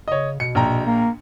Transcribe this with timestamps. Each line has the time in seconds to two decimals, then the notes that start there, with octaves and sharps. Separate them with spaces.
0.08 C#3 C#5 D#5
0.40 B2 C#7
0.55 A#1 G5 A#5
0.86 A#3